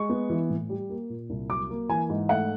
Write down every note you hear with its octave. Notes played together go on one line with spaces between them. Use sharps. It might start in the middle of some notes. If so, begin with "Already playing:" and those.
Already playing: G#3 C#6
B3
E3
A2
G3
A#3
A#2
C2
F#3 D6
A#3
E3 G#5
G#2
A3 F#5